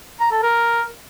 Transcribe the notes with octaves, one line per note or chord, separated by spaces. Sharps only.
A#5
A4
A#4